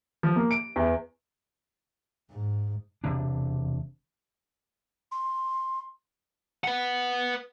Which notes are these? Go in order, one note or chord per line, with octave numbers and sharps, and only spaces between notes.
F3
A#3
D7
E2
G#2
E1 C3 D4
C6
B4 F#5